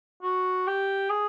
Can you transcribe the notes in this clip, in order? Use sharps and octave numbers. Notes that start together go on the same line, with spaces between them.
F#4
G4
G#4